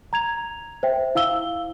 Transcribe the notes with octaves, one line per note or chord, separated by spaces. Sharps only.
A#5 G#6 F7
C5 E5 G5
E4 F5 E6 G7